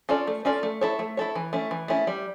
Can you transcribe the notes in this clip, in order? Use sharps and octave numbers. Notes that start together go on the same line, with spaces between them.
C#4 F4 A4 D5
A3
C#4 F4 A4 D5
A3
E4 A4 C#5
A3
E4 A4 C#5
E3
A3 C#4 E4
E3
A3 C#4 E4
G3